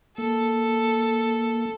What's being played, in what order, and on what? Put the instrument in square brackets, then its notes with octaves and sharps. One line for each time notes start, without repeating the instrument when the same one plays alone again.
[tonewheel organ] A#3 [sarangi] A4